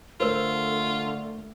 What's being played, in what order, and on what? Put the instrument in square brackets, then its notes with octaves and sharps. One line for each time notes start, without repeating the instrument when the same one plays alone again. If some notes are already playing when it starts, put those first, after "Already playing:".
[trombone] D3 [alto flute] A3 [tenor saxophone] F4 [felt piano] A#4 C5 E6